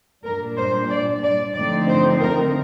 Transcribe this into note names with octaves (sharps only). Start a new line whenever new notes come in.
A#2 G3 D4 A#4
C5
D5
D5
D3 F3 A3 C4 D#4 D5
C5
A#4